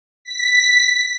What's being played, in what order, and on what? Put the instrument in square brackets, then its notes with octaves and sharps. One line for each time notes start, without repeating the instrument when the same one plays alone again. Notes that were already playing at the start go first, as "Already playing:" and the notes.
[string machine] B6